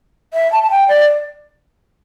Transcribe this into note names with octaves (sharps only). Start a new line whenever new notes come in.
E5
A5
A5
G5
D5